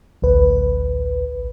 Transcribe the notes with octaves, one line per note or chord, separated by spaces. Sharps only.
A1 D2 B4